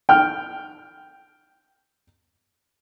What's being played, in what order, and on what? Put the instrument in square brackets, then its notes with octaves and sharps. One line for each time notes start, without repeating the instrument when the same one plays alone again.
[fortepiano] G5 F6